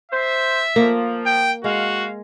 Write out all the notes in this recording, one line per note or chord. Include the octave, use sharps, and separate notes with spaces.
C5 E5
F3 A#3
G5
G#3 F#4 F5